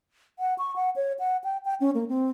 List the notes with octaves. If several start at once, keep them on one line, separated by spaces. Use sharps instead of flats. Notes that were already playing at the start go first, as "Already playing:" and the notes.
F#5
C#6
F#5
C#5
F#5
G5
G5
C#4
A#3
C4